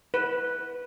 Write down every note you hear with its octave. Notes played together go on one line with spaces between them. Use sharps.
B4